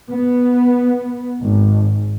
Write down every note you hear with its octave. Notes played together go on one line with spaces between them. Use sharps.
B3
G#1